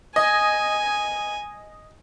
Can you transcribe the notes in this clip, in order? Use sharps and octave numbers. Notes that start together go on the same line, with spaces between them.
D#5 G#5